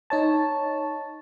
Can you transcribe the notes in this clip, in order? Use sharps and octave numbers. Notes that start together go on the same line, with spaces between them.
D#4 C#5 A5